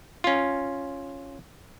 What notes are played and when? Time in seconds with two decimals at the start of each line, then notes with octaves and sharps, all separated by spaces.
0.24 C#4 F4